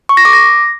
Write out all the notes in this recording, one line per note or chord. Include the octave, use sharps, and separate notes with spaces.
C#6
A#6
D6
A#6